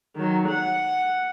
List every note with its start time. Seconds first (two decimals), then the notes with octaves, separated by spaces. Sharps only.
0.15 D#3 F#3
0.48 F#5